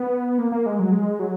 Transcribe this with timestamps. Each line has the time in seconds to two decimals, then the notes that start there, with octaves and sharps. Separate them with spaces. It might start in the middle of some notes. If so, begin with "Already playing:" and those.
Already playing: B3
0.38 A#3
0.52 A#3
0.66 G#3
0.79 F#3
0.92 G#3
1.19 F#3